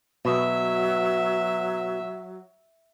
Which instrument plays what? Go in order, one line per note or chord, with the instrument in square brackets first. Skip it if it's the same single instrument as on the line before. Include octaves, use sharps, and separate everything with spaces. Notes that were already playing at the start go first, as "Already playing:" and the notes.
[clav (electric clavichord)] B2 [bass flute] F#3 [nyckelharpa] E5